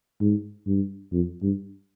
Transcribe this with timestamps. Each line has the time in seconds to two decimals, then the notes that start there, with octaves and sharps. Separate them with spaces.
0.21 G#2
0.67 G2
1.12 F2
1.42 G2